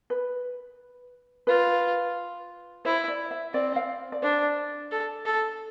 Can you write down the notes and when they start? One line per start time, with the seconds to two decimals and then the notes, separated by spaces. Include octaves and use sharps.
0.10 B4
1.47 F4 B4
2.85 E4 C5
3.08 D5
3.31 E5
3.54 C4 D5
3.76 F5
4.12 D5
4.22 D4 C5
4.91 A4
5.26 A4